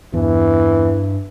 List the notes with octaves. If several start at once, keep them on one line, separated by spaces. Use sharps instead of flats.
E2 G2 E3